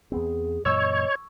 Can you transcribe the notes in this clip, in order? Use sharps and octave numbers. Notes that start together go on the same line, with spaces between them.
E2 B3 C4 G#4
F#2 A#2 E3 C#5 D#5 C#6 E6 G#6